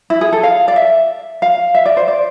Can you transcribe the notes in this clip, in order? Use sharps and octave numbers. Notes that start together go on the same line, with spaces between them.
E4
G#4
A4
F5
D5
E5
F5
E5
D5
C5
D5